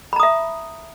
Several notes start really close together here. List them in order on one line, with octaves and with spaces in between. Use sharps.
B5 A#5 D#6 E5